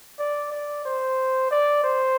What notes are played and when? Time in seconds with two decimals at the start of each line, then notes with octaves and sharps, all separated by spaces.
0.18 D5
0.52 D5
0.85 C5
1.51 D5
1.84 C5